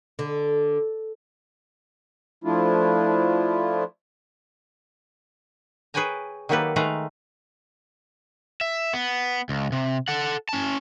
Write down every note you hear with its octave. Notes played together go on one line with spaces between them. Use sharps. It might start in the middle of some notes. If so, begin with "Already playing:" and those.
D3
F3 A3 D4 E4 F4
G#4 B4 C#5 G5 G#5 A#5
D#3 F#3 A#3 G4 A4 B4
D#3 G#3 A3 B4 F5 A#5
E5
B3
C#2
C3
A4 F#5
C#4 A5